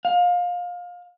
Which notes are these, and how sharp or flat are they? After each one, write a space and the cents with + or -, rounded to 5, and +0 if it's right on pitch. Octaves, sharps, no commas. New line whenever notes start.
F5 +25